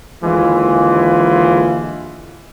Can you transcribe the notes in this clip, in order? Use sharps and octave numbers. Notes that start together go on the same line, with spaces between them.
D#2 D3 E3 G#3 F4